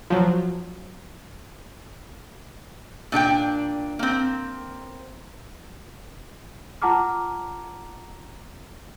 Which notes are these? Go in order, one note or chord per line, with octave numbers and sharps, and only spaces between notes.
F3 F#3
A#2 D4 F#4 G5
A#3 C4
F4 F#5 A5 A#5 D6 F6